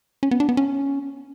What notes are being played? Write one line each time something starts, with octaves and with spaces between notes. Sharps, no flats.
C#4
B3
D4
B3
C#4